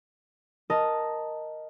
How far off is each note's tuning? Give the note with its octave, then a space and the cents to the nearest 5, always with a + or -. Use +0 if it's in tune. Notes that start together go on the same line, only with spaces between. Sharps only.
A#4 +0 D#5 +0 A5 +0